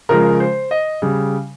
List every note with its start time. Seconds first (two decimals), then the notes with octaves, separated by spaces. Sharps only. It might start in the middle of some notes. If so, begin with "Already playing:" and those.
0.09 C#3 F3 G#3 A#4
0.40 C5
0.71 D#5
1.02 C#3 G3